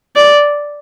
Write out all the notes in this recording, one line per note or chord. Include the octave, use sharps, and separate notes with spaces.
D5